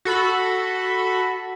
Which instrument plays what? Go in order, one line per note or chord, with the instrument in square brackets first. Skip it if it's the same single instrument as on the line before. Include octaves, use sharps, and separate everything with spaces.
[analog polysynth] F#4 A4 B5